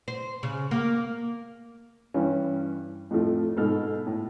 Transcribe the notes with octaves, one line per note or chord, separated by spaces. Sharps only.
C5
C#3
A#3
G2 E3 C#4
F2 A2 F3 A3
G#2 B2 A4 F6
A2